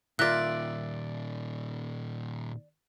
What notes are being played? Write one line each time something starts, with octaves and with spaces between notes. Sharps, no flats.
A#2 D#3 F4 A#4 D5 E5 G5 F#6